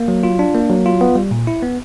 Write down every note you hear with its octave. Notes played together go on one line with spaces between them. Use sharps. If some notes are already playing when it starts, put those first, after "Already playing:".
Already playing: A#3
F#3
F4
D4
A#3
F#3
F4
B3
G3
A#2
E4
B3